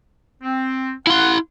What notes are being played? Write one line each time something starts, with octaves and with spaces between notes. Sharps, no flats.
C4
E4 F5 F#5 C6